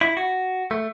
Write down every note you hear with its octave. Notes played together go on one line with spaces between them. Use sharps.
E4
F#4
A3